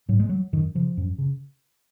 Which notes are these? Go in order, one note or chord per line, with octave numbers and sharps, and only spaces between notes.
G#2 F#3
G#3
F#3
F#2 D#3
C#3 F3
F#2
C#3